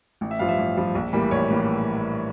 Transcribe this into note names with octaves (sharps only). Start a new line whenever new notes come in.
A1
E5
G2 F3 F5
E5
A1
G2 F3
A#1
A2 E3 G3 A#3
A#1 C#5
A2 E3 G3 A#3